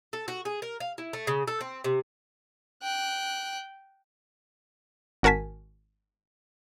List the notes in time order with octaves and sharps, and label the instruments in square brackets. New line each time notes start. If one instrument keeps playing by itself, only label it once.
[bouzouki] A4
F#4
G#4
A#4
F5
E4
A3
C#3
A4
C4
C3
[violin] G5 F#6
[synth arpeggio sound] G#1 F#4 A#4 G#5 A5 B6